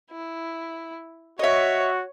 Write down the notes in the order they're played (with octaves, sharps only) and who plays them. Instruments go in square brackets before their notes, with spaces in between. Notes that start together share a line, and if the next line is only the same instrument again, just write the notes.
[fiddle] E4
[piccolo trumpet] F#4 [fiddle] C#5 [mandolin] D#5 E5